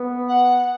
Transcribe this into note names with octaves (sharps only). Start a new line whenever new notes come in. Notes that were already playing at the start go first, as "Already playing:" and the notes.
Already playing: B3
F#5